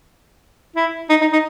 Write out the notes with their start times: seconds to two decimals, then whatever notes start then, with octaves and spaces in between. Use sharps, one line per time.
0.76 E4
1.10 D#4
1.21 D#4
1.33 D#4